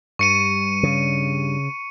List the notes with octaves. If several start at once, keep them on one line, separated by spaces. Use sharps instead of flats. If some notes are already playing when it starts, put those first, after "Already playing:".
G2 C#6 C#7 D#7
C#3